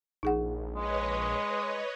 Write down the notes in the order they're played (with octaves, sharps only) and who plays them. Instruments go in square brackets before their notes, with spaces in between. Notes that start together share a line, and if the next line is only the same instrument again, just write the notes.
[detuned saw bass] A#1 [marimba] D#4 G#4 F#5
[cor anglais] G#3 [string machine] B4 C#5 D#5